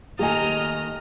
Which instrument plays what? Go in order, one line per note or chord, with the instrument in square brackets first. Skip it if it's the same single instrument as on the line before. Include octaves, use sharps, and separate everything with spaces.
[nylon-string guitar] D#3 A3 A#3 [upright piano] G4 G#5 [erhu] D#5 [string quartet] A#5 F6